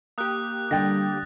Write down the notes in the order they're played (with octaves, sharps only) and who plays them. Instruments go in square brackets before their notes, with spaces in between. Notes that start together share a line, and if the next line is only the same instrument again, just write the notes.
[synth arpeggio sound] A#3 G4 [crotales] D#6 F#6
[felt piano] D3 G5 [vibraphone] G3 [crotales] A6 A#6